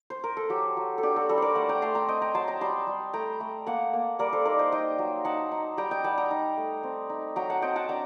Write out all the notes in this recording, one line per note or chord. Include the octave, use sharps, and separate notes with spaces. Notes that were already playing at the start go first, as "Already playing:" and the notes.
Already playing: D5
C5
A#4
A4
F#3 G4
F#3
A4
D4 G4
F#4 A4
G3 F#4 A4
A#4 C5 D5
A3 F#5 A5
G5 A#5
A3 A5 C6
G5 A#5
C4 D#5 G5
G5 A#5
F#3 A5 C6
G5 A#5
G3 A5 C6
G3
A3 G5 A#5
A3
A#3 F#5 A5
A#3
G3 A#4 D5
A4 C5
D#4 A#4 D5
C5 D#5
D#4 D#5 G5
F#3
D#4 F#5 A5
D#4
G3 G5 A#5
D#5 G5
G3 F#5 A5
G5 A#5
D#4
A3
C4
D#4
F#3 G5 A#5
F#5 A5
C4 D#5 G5
F#5 A5
D4 G5 A#5